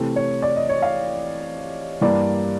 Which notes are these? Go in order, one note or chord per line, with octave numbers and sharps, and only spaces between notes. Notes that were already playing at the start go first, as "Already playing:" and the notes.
Already playing: C3 E3 A3
C#5
D5
D#5
C#5
F5
G2 E3 G3 A#3 D5